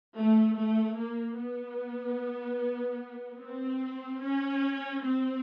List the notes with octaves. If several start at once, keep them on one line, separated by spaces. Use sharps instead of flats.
A3
A3
A#3
B3
C4
C#4
C4